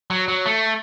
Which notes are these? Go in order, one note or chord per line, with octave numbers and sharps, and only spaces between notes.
F#3
F#3
A3